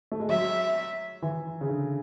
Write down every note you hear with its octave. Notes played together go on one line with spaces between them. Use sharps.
A3
G#3
F#3 E5
E3
C#3
D3